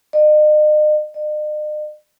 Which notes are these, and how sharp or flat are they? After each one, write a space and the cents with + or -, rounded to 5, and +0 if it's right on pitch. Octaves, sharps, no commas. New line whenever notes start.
D#5 -40
D#5 -45